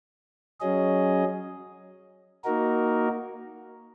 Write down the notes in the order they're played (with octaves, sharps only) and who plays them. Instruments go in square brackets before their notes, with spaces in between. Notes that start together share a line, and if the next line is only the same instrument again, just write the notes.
[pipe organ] F#3 C#4 G#4 D#5
A#3 D#4 F#4 A#4